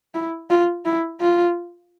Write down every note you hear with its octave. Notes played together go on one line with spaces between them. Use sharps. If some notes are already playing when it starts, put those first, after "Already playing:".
E4
F4
E4
F4